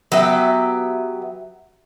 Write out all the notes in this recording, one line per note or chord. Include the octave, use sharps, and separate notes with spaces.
F#3 B3 G4 E5